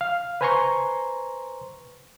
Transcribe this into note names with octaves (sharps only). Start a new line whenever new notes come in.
F5
B4 C5 G#5 A#5 C6 C#6